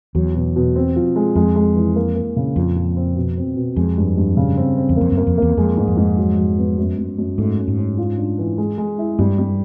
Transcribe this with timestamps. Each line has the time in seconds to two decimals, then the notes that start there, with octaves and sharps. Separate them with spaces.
0.15 E2 F#3
0.35 B2
0.56 B2
0.76 C4
0.96 F3
1.16 G#3
1.35 F2 G#3
1.56 G#3
1.76 E3
1.96 A#3
2.16 A#3
2.36 C#3
2.56 F2 A#2
2.77 F3
2.96 C4
3.16 B2
3.37 C4
3.56 B2
3.76 F2 G#3
3.97 G2
4.17 G2
4.37 C#3
4.57 C4
4.78 C4
4.89 E2
4.96 F2 A#3
5.12 F#2
5.17 A#3
5.27 F2
5.38 E2 A#3
5.57 F2 G#3
5.77 G#2
5.87 F2
5.97 G#2
6.18 F#3
6.38 F#3
6.58 B3
6.78 F#2
6.98 F#2
7.18 F#2
7.38 G#2 A3
7.58 C#4
7.68 G#2
7.78 C#4
7.98 F4
8.18 D4
8.39 E3
8.58 G#3
8.78 G#3
8.98 E4
9.19 G2 G3
9.38 G3